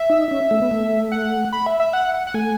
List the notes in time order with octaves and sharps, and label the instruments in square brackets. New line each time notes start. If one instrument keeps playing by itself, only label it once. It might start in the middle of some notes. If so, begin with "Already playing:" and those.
Already playing: [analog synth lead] E5
[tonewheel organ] D#4
C#4
A3
B3
A3
[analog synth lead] F#5
B5
E5
E5
F#5
F#5
F#5
[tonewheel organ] A3 [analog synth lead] G#5